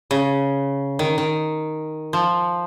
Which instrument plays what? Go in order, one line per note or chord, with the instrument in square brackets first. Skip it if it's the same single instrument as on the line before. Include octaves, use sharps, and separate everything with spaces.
[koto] C#3
D#3
D#3
F3